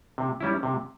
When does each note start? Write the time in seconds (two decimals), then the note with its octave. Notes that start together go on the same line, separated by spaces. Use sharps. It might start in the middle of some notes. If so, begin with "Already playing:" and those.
0.18 C3
0.41 G3 C#4 E4
0.63 C3